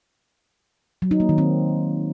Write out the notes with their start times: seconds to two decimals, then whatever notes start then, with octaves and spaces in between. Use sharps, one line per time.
1.02 F#3
1.11 D#4
1.20 A#3
1.29 D#3
1.38 C4